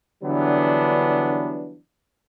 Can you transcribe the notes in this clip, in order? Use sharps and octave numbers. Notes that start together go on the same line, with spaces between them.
D3 E3 F#3 G3 B3 D4